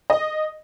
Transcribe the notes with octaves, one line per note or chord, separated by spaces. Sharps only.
D#5